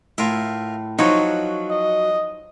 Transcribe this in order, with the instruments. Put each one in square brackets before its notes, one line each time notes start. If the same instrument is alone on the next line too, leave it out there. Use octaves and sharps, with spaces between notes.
[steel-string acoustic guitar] A2 [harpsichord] F4 A#4 E5
[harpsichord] F3 F#4 C#5 [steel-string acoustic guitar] F#3 [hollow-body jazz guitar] D#4
[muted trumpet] D#5